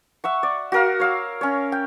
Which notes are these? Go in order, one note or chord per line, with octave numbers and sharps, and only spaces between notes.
E5 F#5 C#6
D5
F#4 A#4 F5
C#5 F5 E6
C#4 C#5
G5